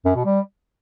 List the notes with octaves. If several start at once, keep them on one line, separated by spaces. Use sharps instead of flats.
F#2
B2
G3